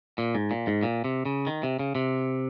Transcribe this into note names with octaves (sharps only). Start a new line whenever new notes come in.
A#2
G#2
A#2
G#2
A#2
C3
C#3
D#3
C3
C#3
C3